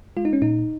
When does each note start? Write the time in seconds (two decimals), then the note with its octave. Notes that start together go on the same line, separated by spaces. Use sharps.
0.17 G#3 F4
0.25 D#4
0.33 C#4
0.42 A#2 D#4